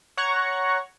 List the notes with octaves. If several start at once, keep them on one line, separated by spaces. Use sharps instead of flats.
C#5 F#5 A#5 C#6